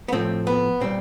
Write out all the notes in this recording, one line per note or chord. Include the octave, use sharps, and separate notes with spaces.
B3
A2 F3 A3 C4
B3
A#2 G3 C4